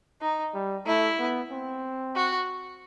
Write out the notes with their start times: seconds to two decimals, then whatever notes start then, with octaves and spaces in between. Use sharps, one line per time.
0.21 D#4
0.54 G3
0.86 A3 E4
1.19 B3
1.51 C4
2.16 F#4